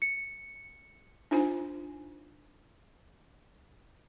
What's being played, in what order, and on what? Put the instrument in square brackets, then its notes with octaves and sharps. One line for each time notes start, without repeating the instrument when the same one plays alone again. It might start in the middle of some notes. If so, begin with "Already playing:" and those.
[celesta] C#7
[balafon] D4 D#4 F4 C5 G#5